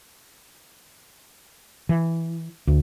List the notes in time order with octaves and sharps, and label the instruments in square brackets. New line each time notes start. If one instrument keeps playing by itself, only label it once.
[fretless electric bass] E3
D2